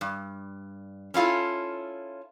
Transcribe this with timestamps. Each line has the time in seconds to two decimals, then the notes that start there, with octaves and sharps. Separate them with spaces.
0.01 G2
1.14 C#4 E4 F4 A4